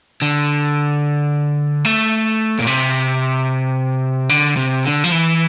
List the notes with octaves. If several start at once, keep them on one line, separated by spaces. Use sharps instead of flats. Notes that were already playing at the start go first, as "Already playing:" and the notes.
D3
A3
A#2
C3
D3
C3
D3
F3
E3